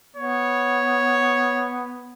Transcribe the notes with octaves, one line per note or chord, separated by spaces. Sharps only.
B3 C#5